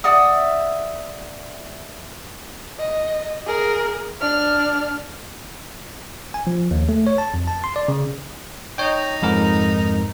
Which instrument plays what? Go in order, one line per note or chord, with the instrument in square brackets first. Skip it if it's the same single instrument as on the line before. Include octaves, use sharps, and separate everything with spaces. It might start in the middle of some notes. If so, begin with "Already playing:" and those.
[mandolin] D5 E5 F#5 D#6
[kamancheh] D#5
G#4 A#4
D4 F6
[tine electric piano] G#5
F3
D#2
A3
C#5
A5
F2
A5
C6
D5
C#3
[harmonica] D#4 [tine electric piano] C#5 G5
[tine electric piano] F2 G#2 A#4